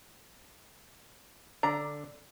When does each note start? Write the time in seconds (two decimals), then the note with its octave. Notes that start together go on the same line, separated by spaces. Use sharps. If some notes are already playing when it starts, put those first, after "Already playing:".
1.63 D3 D4 A#5